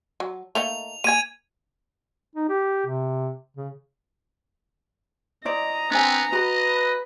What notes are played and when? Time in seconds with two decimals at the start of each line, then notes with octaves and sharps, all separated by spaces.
0.20 F#3
0.55 A3 A#3 D#4 F7
1.04 A#3 G#5 G#6 D#7
2.36 D#4
2.49 G4
2.87 C3
3.57 C#3
5.45 E4 C5 D5 D#5 A#5
5.91 B3 C4 D4 G#5
6.32 F#4 B4 D#5 B5